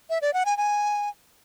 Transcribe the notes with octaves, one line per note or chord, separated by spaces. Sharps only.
E5
D5
F#5
G#5
G#5